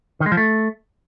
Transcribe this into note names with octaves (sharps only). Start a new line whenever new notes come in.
D#3
G#3
F3
A3